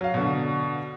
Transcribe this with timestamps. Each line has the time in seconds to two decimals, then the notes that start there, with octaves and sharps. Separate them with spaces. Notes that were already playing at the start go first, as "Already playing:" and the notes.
0.01 F#3 F5
0.14 B2 D3